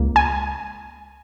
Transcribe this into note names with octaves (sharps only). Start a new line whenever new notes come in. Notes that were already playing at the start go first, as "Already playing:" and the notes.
Already playing: C#2 A#3
G#5